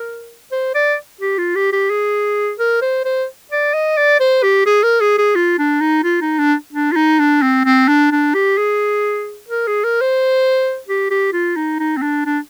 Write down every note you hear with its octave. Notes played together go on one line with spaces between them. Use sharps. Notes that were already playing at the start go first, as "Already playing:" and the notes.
Already playing: A#4
C5
D5
G4
F4
G4
G4
G#4
A#4
C5
C5
D5
D#5
D5
C5
G4
G#4
A#4
G#4
G#4
F4
D4
D#4
F4
D#4
D4
D4
F4
D#4
D4
C4
C4
D4
D4
G4
G#4
A#4
G#4
A#4
C5
G4
G4
F4
D#4
D#4
C4
D4
D4